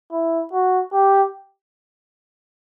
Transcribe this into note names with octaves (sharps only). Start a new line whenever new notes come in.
E4
F#4
G4